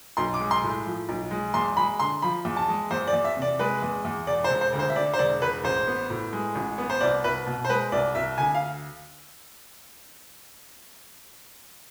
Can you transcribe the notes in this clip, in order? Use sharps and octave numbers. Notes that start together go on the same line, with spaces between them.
B1 C6
D6
G#3
C6
A2
F3
B1
G#3
E2 C6
G#3 B5
D3 C6
F3 B5
E2
A5
G#3
E2 C5
D5
E2
E5
C3
D5
G#3 B4
E2
E2
E1 D5
C5
E1
C5
D2
C5
E5
D3 D5
C5
E1 D5
E1 B4
A1 C5
B3
A2
G#3
A1
B3
C5
C2 D5
C2 B4
B2
C5
G#3 B4
C2 D5
C2 E5
D2 G#5
F5